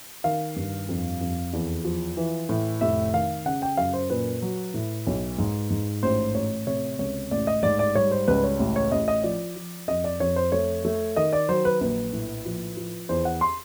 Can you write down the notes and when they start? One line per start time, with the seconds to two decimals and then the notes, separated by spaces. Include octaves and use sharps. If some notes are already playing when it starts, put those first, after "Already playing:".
0.24 D#3 F5
0.56 G2
0.89 F2
1.21 F2
1.53 E2
1.85 F3
2.17 E3
2.49 A2
2.81 F1 E5
3.13 D#3 F5
3.46 C#3 F#5
3.62 G5
3.77 F#2 F5
3.93 C5
4.10 A#2 B4
4.42 F#3
4.74 A2
5.07 B1
5.38 G#2
5.70 G#2
6.03 A1 C5
6.35 A1 C#5
6.67 C3 C#5
6.99 C#2 C#5
7.31 A1 D5
7.47 D#5
7.63 G#2 D5
7.79 D5
7.95 G3 C#5
8.11 C5
8.28 C#2 B4
8.44 C#5
8.60 A1
8.76 C#5
8.92 A1 D#5
9.08 D#5
9.23 F3 D5
9.56 F3
9.88 F2 D#5
10.04 D5
10.20 F2 C#5
10.36 C5
10.52 A3 C#5
10.85 A3
11.16 D#3 D#5
11.33 D5
11.49 F#3 C5
11.65 B4
11.81 A#1 B4
12.13 A2
12.45 F3
12.77 F3
13.09 E2 C5
13.25 F#5
13.41 C6